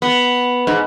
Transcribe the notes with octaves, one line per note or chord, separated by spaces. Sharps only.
B3
G#2